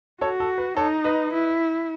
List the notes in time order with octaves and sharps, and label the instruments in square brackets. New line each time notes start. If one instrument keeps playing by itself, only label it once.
[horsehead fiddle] F#4 [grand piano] A4 C#5
[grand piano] A4
B4
[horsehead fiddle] D#4 [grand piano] A4 C#5
[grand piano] B4 D#5
[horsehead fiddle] E4